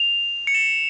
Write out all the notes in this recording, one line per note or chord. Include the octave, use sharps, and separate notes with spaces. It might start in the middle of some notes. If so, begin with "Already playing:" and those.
Already playing: F7
C#7
E7